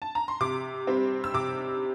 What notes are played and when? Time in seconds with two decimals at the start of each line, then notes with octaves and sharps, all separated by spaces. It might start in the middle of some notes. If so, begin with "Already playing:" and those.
0.02 A5
0.15 A#5
0.28 C6
0.40 C3 D6
0.87 G3 C4
1.24 E6
1.34 C3 D6